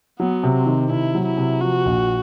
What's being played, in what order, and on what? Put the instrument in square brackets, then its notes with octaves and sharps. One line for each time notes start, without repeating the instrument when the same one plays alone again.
[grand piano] F#3 [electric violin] B3
[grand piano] C3
[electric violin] C4
[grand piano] D#3
[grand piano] C3 [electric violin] E4
[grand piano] F#3
[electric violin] E4
[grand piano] C3
[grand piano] F3 [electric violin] F#4
[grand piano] A#1